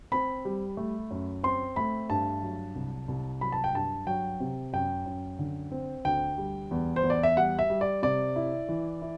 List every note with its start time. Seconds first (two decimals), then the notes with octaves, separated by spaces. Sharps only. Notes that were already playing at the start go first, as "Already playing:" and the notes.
0.12 C4 B5
0.45 G3
0.77 A3
1.11 F#2
1.43 C4 C6
1.76 A3 B5
2.10 G2 A5
2.43 F#3
2.75 C2
3.08 C2
3.41 F#3 B5
3.52 A5
3.64 G5
3.74 G2 A5
4.07 F#3 G5
4.40 C3
4.73 F#2 G5
5.06 F#2
5.39 D3
5.72 C4
6.05 D2 G5
6.38 G3
6.71 E2
6.96 C5
7.04 E2
7.10 D5
7.23 E5
7.37 G3 F#5
7.59 E5
7.70 G3
7.81 D5
8.02 C3 D5
8.36 E4
8.69 E3
9.02 E4